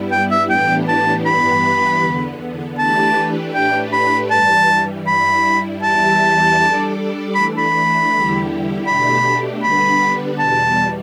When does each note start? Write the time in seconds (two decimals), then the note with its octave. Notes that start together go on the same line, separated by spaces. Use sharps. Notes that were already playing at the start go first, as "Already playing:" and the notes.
Already playing: G2 G3 B3 E4
0.12 G5
0.31 E5
0.50 A2 E3 B3 D4 G4 G5
0.88 A5
1.26 G2 E3 B3 G4 B4 B5
2.02 E2 D3 B3
2.78 E3 A3 D4 G4 B4 A5
3.54 A2 A3 D4 G4 B4 G5
3.93 B5
4.30 G2 E3 G3 A5
5.07 G2 G3 E4 B5
5.83 E2 E3 G3 E4 G4 A5
6.59 G3 D4 A4 D5
7.35 E3 A3 D4 B5
7.58 B5
8.11 E2 D3 G3 E4 G4
8.87 B2 A3 D4 G4 B5
9.63 D3 G3 B3 D4 B4 B5
10.39 E2 B2 G3 A5